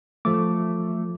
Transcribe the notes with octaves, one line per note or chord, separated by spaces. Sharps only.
F3 A3 D6